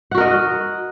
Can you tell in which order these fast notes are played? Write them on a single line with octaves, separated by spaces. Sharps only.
F#5 F#4 A#4 D#5